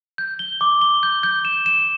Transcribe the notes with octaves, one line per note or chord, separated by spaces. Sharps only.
G6
G7
D6
G7
G6
G6
E7
E7